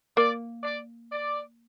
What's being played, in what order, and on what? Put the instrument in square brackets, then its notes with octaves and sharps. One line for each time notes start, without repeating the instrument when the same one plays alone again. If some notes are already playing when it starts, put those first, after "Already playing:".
[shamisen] A#3 [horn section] D5
[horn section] D5
D5